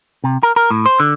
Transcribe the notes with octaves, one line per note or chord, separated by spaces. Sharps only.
C3
A#4
A#4
A2
C5
D3